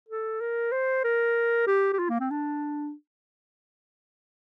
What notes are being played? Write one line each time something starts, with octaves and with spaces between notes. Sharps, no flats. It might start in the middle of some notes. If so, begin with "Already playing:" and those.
A4
A#4
C5
A#4
G4
G4
F4
A#3
C4
D4